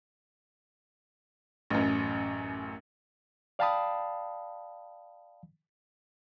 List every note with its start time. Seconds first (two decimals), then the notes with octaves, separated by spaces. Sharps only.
1.70 A1 F#2
3.59 D5 F5 G5 A5 B5 D#6